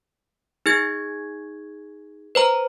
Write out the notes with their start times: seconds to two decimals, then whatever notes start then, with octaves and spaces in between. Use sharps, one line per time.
0.66 D#4 G#4 G#6
2.35 B4 C5 A#5